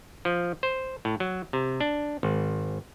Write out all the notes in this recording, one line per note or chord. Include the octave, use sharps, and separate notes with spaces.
F3
C5
A2
F#3
C3
D4
G#1